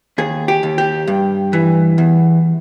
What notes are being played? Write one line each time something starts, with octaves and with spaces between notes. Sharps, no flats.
D#2 G#4
G4
D#2
G4
G2
E3
E2